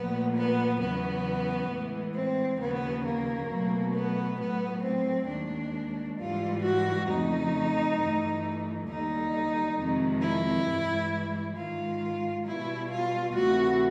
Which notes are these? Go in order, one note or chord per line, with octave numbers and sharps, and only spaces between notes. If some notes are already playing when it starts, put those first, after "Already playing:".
Already playing: A#2 F3 A3 B3
B3
E2 C#3 F#3 B3
A2 E3 G#3
C4
D#2 C#3 F3 B3
A#3
B2 F#3 A3
B3
A2 F#3 A3 B3
C4
D#2 D#3 G#3 D4
G#2 E3 G3 F4
F#4
F2 C#3 F3 A3 D#4
G2 E3 A3
D#2 D3 G3 D#4
F2 C3 D#3 G#3
E4
G2 E3 G#3
G#2 D#3 G#3 F4
B2 G3 E4
F4
D2 C3 E3 A3 F#4